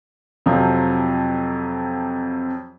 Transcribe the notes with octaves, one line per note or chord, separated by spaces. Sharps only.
F2 C3 F3 F#3